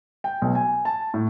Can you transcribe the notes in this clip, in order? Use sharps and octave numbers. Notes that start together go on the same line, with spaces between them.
G5
B1
G#5
A5
A2